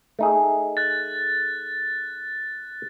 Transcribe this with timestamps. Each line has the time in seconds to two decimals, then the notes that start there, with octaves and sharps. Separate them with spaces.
0.19 A3 D#4 G#4
0.77 F#6 A6